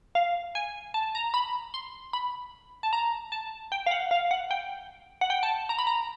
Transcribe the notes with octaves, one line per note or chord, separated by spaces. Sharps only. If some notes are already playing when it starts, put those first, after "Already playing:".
F5
G#5
A5
A#5
B5
C6
B5
A5
A#5
A5
G5
F5
F#5
F5
F#5
G5
F#5
G5
A5
A#5
B5
A#5